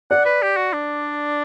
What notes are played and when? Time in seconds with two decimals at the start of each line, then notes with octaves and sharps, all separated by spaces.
0.11 D5 F#5
0.25 B4
0.42 G4
0.57 F#4
0.73 D4